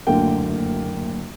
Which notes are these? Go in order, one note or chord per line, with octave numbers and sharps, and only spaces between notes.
F#1 D2 D3 A#3 G5